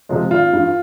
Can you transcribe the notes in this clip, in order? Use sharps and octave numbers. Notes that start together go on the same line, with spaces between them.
C3 F3 G#3
G#1 F4
G2 E3